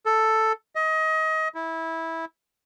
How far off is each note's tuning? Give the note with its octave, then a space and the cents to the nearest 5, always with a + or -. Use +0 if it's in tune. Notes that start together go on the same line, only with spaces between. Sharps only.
A4 +5
D#5 +25
E4 -15